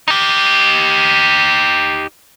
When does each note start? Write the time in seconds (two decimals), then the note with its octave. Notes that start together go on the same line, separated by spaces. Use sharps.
0.08 D#4 G4